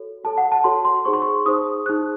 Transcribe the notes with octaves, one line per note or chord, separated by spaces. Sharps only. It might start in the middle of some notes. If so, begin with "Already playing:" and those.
Already playing: F#4 A4 C#5
F#4 A4 C#5 A5
F#5
A5
F#4 A4 C#5 C6
C6
D#4 G#4 C5 C#6
C6
C#6
D#4 G#4 C5 D#6
D#4 G#4 C5 F#6